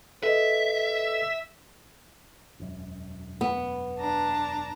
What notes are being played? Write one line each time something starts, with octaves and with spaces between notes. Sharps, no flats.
A4 B4 D#5 E5
E1 F#2
B3
D4 A5 A#5